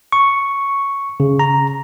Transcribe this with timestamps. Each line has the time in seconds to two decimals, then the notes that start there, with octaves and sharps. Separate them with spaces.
0.12 C#6
1.20 C#3
1.39 A#5